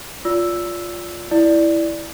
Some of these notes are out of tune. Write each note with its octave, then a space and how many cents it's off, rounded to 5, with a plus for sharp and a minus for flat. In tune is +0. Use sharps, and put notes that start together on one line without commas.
F4 +0 D5 -30 E6 +0
E4 +0 D5 +0